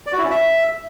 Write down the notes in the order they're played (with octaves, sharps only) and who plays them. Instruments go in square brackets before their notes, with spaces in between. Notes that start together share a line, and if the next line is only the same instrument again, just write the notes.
[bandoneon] D5
F#4
E4
C#4
E5